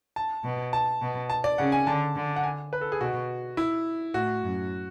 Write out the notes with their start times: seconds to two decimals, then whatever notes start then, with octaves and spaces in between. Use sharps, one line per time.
0.16 A5
0.45 B2
0.73 A5
1.01 B2
1.30 A5
1.44 D5
1.58 C#3 F#5
1.72 G#5
1.87 D3 A5
2.16 D3
2.36 F#5
2.43 G#5
2.73 B4
2.81 A4
2.92 G#4
3.01 B2 F#4
3.57 E4
4.14 A2 F#4
4.43 F#2